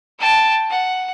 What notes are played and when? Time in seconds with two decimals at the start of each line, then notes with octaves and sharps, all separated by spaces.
0.19 G5 A5
0.70 F#5